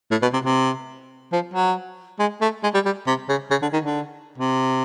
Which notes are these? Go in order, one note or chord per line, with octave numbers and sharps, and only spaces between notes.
A2
B2
C3
C3
F3
F#3
G#3
A3
G#3
G3
G3
C3
C#3
C#3
D3
D#3
D3
C3